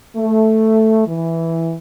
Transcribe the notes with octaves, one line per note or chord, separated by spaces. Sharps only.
A3
E3